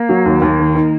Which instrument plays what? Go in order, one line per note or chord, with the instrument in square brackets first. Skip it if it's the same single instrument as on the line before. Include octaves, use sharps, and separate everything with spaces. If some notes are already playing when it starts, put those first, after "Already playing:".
Already playing: [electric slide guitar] A#3
[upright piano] F#3
D#2
D#2
D#3
D#3